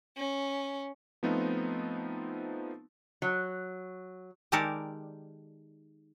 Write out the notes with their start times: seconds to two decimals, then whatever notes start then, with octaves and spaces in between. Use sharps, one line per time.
0.17 C#4
1.23 F3 A3 B3 C4 D#4 F4
3.22 F#3
4.52 D#3 G#3 G4 A4 A#4 D5